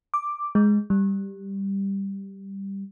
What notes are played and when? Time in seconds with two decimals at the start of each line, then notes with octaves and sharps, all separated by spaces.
0.14 D6
0.55 G#3
0.90 G3